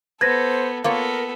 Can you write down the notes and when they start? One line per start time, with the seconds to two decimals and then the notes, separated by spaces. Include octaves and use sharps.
0.21 B3 A4 B4 C5 G#6 A#6
0.84 A#3 B3 F4 A4 A#4 C#5